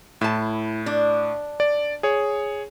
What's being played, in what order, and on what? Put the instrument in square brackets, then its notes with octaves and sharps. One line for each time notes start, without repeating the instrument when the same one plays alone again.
[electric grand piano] A2 [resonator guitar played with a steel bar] E4 A5
[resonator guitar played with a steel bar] D4
[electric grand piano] D5
G#4 C#5